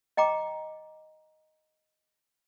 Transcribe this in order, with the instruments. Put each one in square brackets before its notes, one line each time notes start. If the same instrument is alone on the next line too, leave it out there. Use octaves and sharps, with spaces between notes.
[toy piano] D#5 G5 A#5 D6